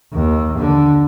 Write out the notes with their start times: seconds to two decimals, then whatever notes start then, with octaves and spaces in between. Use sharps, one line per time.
0.13 D#2
0.59 D3